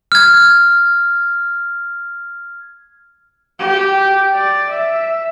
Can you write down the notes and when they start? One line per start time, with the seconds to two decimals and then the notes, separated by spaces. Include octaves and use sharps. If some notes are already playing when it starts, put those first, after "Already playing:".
0.12 F6 G#6
3.60 G4
4.33 D5
4.70 E5